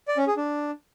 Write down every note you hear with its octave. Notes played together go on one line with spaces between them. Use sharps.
D5
C#4
G#4
D4